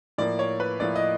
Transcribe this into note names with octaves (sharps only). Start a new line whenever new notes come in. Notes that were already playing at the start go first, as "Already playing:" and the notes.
A2 F3 A#3 D5
C#5
B4
A2 F3 A#3 D5
D#5